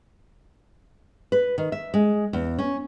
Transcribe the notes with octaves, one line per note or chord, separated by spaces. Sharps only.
B4
D#3
E5
G#3
E2
C#4